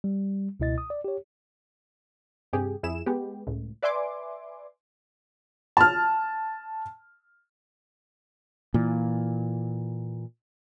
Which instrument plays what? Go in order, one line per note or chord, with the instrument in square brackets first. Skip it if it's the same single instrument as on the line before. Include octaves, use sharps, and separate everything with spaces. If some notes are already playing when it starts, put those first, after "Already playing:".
[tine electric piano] G3
C#2 B2 E4 D#5 A6
D#6
D5
G4 C#5
[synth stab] G2 C3 G4 G#4
F2 E4 G#4 E7
G#3 B3 G4
C#2 A2
B4 D5 E5 G#5 C6 D6
[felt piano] A5 F6
[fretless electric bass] A#2 E3